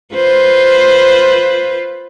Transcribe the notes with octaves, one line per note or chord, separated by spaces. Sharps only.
F4 B4 C5